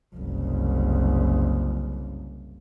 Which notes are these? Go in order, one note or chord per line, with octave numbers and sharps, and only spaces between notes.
F#1 C2